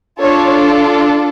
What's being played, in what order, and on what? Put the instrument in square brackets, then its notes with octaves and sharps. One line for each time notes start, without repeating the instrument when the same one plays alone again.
[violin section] D4 F4 A4 C#5